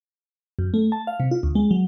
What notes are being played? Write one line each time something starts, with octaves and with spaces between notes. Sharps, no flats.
F#2
A3
A5
F5
C3
F4
D2
G#3
F#3